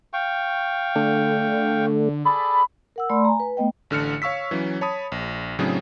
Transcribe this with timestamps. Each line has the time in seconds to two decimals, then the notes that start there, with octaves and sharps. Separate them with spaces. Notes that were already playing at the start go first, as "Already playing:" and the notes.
0.13 F5 G5 C#6
0.95 D3 A3
2.25 G#4 A4 D5 B5
2.96 A#4 F#5 E6
3.10 A3 D5 A5 B5 C6
3.25 G#5 A#5
3.40 B4
3.57 A3 B3 D#5 G5
3.90 A1 D3 F6 C#7
4.22 C#5 F5 C#6 E6 B6
4.51 E3 F#3 C#4
4.81 C#5 A5 B5 D#6
5.12 A#1
5.59 A2 C#3 F#3 C4 D4 G#4